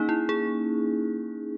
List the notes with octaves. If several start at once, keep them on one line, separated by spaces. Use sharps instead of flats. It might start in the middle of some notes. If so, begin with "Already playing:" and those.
Already playing: A#3 C#4 D#4 G#4
E4
G#4